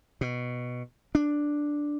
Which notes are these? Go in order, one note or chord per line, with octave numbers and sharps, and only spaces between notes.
B2
D4